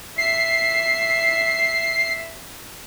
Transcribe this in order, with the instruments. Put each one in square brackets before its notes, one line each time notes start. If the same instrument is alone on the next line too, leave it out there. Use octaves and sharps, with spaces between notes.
[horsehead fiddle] E5 [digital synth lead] C7